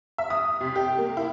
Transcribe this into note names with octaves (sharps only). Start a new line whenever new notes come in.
E5
D#6
C3
G4
A#3
E4